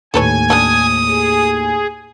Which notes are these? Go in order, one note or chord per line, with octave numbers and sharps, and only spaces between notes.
D#2 A2 A4 B4 C#5 G#5
G3 D4 A4 D#6
G#4